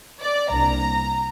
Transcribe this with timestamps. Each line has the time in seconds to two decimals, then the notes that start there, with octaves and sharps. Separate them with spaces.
0.21 D5
0.50 C2 C3 A#3 D4 A#5